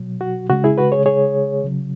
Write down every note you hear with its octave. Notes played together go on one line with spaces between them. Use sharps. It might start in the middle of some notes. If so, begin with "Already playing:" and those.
Already playing: B2 F#3
F#4
C#3 G#3 F#4
E4 G#4
F#4 B4
G#4 C#5
G#4 C#5
C#3 F#3